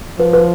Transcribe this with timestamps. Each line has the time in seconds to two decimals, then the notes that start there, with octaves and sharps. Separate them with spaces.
0.19 F3 B4
0.33 B4